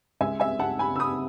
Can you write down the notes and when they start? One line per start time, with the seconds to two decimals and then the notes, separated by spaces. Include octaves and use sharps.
0.21 C#2 C#3 G#3 E5 G#5
0.40 E5 G#5
0.59 F#5 A5
0.79 G#5 B5
0.96 E6
0.99 B5 D#6